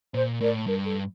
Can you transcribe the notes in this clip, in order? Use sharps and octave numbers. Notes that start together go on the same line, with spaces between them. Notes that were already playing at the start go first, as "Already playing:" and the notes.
A#2 C5
A2 A#4 D5
G2 A#4
A4